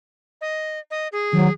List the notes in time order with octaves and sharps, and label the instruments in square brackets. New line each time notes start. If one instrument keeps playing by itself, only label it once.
[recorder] D#5
D#5
G#4
[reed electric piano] D#3 [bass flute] F#3